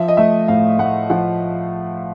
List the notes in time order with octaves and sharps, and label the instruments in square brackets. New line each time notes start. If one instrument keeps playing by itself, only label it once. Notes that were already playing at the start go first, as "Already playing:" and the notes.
Already playing: [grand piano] F3 E5
D#5
A3 E5
A2 F5
A2 F#5
F3 F#5